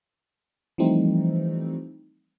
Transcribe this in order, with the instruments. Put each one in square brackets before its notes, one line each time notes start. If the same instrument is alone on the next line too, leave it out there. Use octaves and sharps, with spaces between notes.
[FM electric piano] E3 F3 G3 A3 C4 D#4